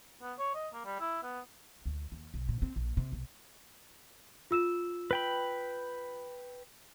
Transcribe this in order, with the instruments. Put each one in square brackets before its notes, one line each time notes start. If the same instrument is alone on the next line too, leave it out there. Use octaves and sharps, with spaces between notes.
[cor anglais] B3
C#5
D#5
A#3
G3
E4
B3
[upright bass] D2
D#2
B1
A#2
C4
A#1
C3
B1
[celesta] F4 E6 E7
[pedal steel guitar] B4 G5 B5